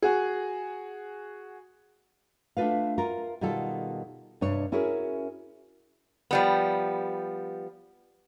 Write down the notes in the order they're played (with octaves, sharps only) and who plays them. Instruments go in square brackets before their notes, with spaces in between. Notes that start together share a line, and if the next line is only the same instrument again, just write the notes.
[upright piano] F#4 G#4
[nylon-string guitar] A3 D4 D#4 F4 B4 F5
F4 A#4
B2 D#3 G3 F4 A4
G2 C3 D4 C#5
C#4 E4 F#4 G#4 A#4 C#5
[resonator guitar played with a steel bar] F3 G3 B3